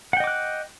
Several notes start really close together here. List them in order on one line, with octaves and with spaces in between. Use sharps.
F#5 G5 D#5 D6 F#6